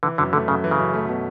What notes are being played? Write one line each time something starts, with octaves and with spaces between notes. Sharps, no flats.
D3 E3
F#2 D3
D3 A3
F#2 C#3
E3
C#3
F#2
A3
B2